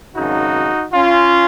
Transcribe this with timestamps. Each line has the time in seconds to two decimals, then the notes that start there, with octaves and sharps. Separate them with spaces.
0.15 G#1 F#2 C#3 D#4 F#4
0.92 C#4 F4